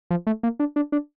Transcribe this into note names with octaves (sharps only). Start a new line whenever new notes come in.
F3
A3
A#3
D4
D4
D4